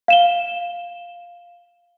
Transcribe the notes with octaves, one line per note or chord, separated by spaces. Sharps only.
F5 E7 G7